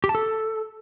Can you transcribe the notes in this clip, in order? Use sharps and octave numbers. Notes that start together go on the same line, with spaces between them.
G4
A5
A4